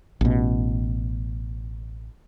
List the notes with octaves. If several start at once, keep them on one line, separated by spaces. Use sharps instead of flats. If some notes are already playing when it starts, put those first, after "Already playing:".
A1 B2